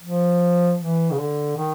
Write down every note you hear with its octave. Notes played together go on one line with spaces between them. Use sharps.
F3
E3
C#3
D3
D#3